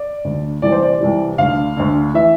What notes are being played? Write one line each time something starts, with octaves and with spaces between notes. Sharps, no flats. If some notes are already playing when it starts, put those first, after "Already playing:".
Already playing: D5
D2 D3
C2 C3 E3 D5
C5
D5
C2 C3 E3
D2 D3 F5
D2 D3
E3 E5